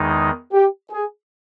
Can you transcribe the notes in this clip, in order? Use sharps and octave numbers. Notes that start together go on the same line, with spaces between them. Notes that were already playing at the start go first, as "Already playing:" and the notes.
Already playing: E2 D#3 G#3 D#4
G4
G#4